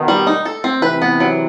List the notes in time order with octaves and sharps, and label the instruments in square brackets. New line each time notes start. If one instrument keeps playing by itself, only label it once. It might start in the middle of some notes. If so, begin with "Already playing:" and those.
Already playing: [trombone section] B2 D#3
[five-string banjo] G3
D#4
A4
C4
[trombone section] C3 E3 [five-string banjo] B4
[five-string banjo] B3
F#3